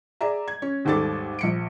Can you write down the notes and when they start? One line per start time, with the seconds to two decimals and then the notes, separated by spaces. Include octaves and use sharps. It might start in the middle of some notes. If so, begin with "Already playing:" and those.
0.21 G#4 D5 E5 A#5
0.48 G#6
0.62 C#4
0.85 D#2 G#2 G3 A4 D6 A6
1.39 A#1 C#7 D7